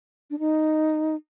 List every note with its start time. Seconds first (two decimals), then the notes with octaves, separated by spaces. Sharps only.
0.31 D4
0.39 D#4